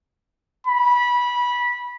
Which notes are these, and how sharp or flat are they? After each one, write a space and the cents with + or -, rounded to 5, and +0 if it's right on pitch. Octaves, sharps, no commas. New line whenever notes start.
B5 -20